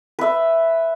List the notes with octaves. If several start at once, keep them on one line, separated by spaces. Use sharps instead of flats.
B4 E5